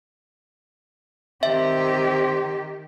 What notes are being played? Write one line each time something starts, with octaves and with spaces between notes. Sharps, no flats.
D#3 C4 G4 E5